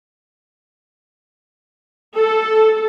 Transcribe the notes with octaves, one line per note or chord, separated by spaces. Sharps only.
A4